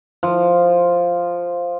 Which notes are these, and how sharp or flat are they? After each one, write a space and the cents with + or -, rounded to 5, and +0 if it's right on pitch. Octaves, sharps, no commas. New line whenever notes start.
F3 +0